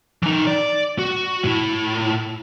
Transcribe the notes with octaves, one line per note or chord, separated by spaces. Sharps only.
E3 D#4
D5
F#4
A2 E4